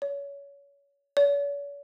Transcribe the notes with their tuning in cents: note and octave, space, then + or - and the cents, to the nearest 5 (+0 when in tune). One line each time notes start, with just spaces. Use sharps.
C#5 +25
C#5 +45